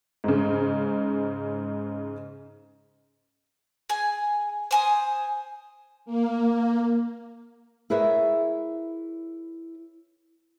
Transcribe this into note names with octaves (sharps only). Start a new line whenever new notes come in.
G#2 C#3
G#4 G#5
C5 G#5 D#6
A#3
E4 G#4 A#4 B4 C#5 E5